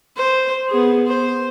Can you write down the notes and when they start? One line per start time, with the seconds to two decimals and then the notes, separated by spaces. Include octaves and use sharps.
0.16 C5
0.69 B3 G#4
1.07 C5